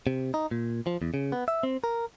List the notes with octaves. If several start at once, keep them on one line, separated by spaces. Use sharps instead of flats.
C3
D#4
A#2
F3
E2
C#3
B3
E5
C4
A#4